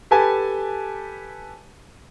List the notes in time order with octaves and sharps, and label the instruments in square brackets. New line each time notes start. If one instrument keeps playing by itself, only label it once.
[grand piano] G4 A4 B4 G#5 A5